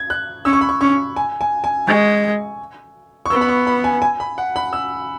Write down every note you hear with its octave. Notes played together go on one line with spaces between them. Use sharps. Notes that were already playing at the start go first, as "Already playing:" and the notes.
Already playing: G#6
F#6
C#4 E6
C#6
B5
C#6
C#4 C#6
G#5
G#5
G#5
G#3 C#6
C#6
B3 E6
B5
C#6
B5
G#5
G#5
B5
F#5
B5
E6